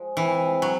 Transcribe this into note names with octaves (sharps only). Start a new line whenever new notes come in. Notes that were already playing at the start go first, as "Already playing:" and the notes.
Already playing: F3 G#3
C3 E3
F3 G#3
F#3